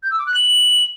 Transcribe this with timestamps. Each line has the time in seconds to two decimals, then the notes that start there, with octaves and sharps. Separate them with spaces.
0.03 G6
0.11 E6
0.19 D6
0.27 F#6
0.34 F#7